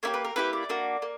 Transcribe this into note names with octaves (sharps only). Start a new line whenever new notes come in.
A#3 E4 G4 C#5
B4
A#4
A#3 E4 G4 B4
D5
A#3 D4 F#4
A#3